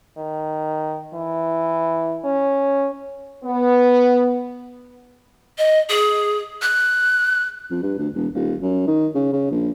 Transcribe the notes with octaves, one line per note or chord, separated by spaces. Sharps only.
D#3
E3
C#4
B3
D#5
G#4
F#6
F2
G2
D2
E1
D#1
F#2
D#3
C#3
C#3
A#1